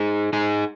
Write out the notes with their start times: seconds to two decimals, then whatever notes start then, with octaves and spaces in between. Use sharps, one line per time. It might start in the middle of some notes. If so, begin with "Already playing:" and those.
Already playing: D#4 G#4
0.33 D#4 G#4